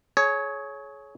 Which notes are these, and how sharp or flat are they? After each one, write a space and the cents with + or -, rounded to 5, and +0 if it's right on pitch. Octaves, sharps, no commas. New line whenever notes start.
G#4 +35 C#5 +0